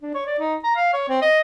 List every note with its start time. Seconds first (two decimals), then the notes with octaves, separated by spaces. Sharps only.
0.02 D4
0.14 C#5
0.26 D5
0.39 D#4
0.63 A#5
0.76 F5
0.93 C#5
1.09 C4
1.22 D#5